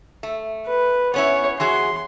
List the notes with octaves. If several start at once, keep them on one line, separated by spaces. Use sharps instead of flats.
A3
B4
B3 C#4 E4 C#5
E3 F#4 G#4 C6